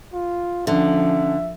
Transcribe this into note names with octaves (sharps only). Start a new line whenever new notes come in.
F4
D3 F3 C#4 E5